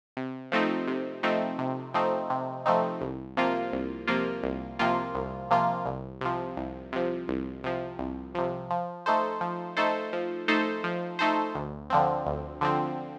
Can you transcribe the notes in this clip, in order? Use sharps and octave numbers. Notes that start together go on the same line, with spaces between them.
C3
F3 A3 C4 D#4
C3
F3 A3 C4 D#4
C3
F3 A3 C4 D#4
C3
F3 A3 C4 D#4
C2
C3 F3 A#3 F4
C2
C3 F3 A#3 F4
C2
C3 F3 A#3 F4
C2
C3 F3 A#3 F4
C2
C3 F3
C2
C3 F3
C2
C3 F3
C2
C3 F3
F3
A3 D#4 A4 C5
F3
A3 D#4 A4 C5
F3
A3 D#4 A4 C5
F3
A3 D#4 A4 C5
D2
D3 F3 C4
D2
D3 F3 C4